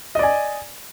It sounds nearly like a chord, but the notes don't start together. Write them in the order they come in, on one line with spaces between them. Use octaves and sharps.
D#5 D5 G#5